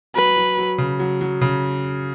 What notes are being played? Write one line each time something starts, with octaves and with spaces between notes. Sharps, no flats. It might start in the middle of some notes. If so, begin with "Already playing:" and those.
F#3 B4
F#3
F#3
C#3
F#3
F#3
C#3